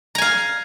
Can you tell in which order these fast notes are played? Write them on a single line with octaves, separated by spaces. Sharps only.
A#5 G#5 F5